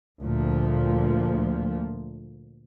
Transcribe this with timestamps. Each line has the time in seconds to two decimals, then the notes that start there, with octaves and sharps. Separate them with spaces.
0.20 D2 A#2 F3